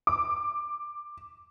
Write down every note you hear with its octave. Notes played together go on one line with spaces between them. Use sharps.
D6